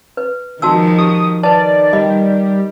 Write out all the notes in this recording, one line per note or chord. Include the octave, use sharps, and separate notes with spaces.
B4
D#3 F3 G#3 F#4 A5 E6
G4 D#6
D#3 B4 D5 A5
G3 D#5